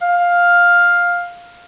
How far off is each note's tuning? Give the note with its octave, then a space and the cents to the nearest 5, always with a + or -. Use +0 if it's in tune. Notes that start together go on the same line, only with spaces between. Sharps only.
F5 +10